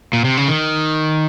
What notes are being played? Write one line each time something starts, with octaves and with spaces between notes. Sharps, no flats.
A#2
C3
C#3
D#3